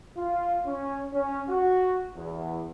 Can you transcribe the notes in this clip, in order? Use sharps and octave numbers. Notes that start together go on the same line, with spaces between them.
F4
C#4
C#4
F#4
E2